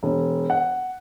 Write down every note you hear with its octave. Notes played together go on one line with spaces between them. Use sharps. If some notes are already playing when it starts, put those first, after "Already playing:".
E1
F#5